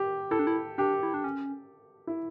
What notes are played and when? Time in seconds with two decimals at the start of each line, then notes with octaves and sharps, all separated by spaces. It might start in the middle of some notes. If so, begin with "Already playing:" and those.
Already playing: G4
0.31 E4 A4
0.39 D4
0.47 E4
0.78 D4 G4
1.03 E4
1.14 D4
1.24 C#4
2.07 E4